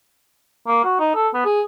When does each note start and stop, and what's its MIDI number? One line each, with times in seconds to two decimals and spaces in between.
0.67 0.84 58
0.85 0.96 66
1.00 1.11 63
1.15 1.29 69
1.34 1.41 59
1.45 1.62 68